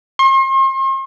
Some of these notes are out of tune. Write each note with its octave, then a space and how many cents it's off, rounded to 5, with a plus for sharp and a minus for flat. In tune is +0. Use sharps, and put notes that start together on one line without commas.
C6 +40